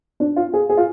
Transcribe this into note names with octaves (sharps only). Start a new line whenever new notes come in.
D4
F4
G#4
G#4
F4